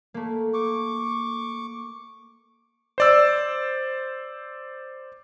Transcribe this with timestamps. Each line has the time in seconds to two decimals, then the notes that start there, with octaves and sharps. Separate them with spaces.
0.14 A3 A#3
0.54 C#6 D6
2.98 C5 D5 E6